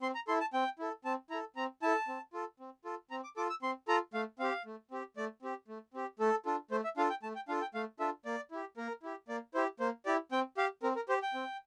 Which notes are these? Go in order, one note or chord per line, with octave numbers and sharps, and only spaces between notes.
C4 C6
A#5
E4 A4 C6
A5
C4 G5
E4 A4
C4 A5
E4 A4 A#5
C4 A#5
E4 A4 A5
C4
F4 A4
C4
F4 A4
C4 A#5
D6
F4 A4 D6
E6
C4 C6
F4 A4 A#5
A3 F5
C4 G4 F5
A3
C4 G4
A3 D5
C4 G4
A3
C4 G4
A3 A4
D4 F4 A4
A3 C5
E5
D4 F4 A4 F5
G5
A3 A5
G5
D4 F4 A4 F5
G5
A3 F5
D4 F4 A4 E5
A#3 D5
E4 G4
A#3 A#4
E4 G4
A#3 D5
E4 G4 C5
A#3 C5
E4 G4 D5
C4 G5
G4 F5
C4 A#4
A#4
G4 C5
G5
C4